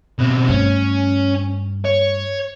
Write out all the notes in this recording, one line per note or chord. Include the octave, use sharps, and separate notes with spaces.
B2 C4
G2 A3 C#4
C#5